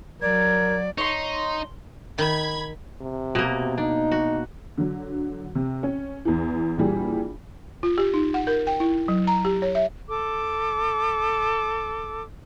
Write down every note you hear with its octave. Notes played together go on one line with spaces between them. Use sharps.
F#3 A#4 D5 G#6
D#4 C#5 C6
D#3 B5 G#6
C3
B2 A#3
D4 D#4
F#4
D3 F#3
C3
C#4
E2 E3
A#1 A#2 E3 G3 G#4
F4
G4
D#4
F#5
A#4
G5
E4
F#3
A#5
G4
C#5
E5
A4 D6